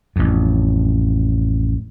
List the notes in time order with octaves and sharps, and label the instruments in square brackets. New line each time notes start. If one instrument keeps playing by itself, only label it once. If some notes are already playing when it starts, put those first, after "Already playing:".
[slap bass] A1 F2